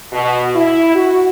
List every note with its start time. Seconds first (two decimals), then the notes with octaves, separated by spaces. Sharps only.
0.12 B2
0.56 E4
0.95 F#4